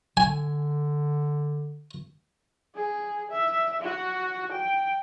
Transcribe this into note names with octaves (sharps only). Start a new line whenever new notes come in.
D3 G#5
G#4
E5
F#4
G5